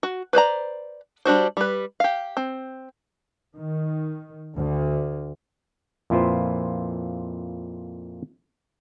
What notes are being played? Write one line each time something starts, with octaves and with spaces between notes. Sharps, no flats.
F#4
B4 C5 D5 A#5
G3 D4 F#4 C5
G3 B4
G4 F5
C4
D#3
D2
F2 A#2 E4 F4 B4 C5